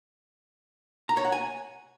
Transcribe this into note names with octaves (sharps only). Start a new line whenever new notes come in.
A#5
C#5
F#5
G#5